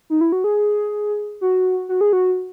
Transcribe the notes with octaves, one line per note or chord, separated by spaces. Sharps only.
D#4
E4
F#4
G#4
F#4
F#4
G#4
F#4